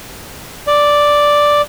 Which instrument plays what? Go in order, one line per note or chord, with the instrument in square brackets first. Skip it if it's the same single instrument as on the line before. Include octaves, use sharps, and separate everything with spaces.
[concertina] D5